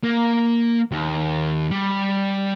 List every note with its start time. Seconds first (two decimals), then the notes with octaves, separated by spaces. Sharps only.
0.04 A#3
0.91 D#2
1.71 G3